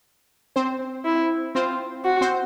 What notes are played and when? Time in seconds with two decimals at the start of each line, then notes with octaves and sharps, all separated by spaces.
0.56 C4 C5
1.05 E4
1.55 C4 F4 C5
2.04 F#4
2.21 C4 C5